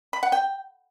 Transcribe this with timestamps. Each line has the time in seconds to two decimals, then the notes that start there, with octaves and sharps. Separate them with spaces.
0.13 B5
0.23 F#5
0.32 G5